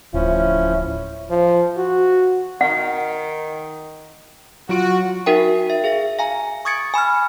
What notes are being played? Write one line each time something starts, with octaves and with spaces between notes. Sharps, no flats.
D1 F3 C#4 E4
F3
F#4
D#3 F#5
F#3 F4 F#4 D7
D#4 F#4 A#4 E5 G5
E5
G#4 E5 F5
F5 G#5 A#5
C#6 D#6 G#6 A6 C#7 D7
G#5 B5 E6 F6